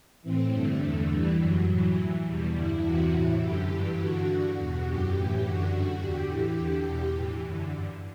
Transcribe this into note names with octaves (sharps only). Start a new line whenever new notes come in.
A2 E3 C4
G2 D3 A3
E2 D3
G2 E3 G3
F#2 D3 F#3
A2 E3
A2 E3
E2 B2 G3
G2 D3 E4
E2 C3 E3 F#4
A2 E3 E4
F#2 D3 G4
G2 E3
G2 D3 F#4
G2 D3 F#4
E2 B2 F#4
F#2 D3 G4
A2 E3
F#2 D3 F#4
G2 D3 F#4
E2 D3 G4
A2 E3 G4
E2 D3
E2 B2
A2 E3
F#2 D3
G2 D3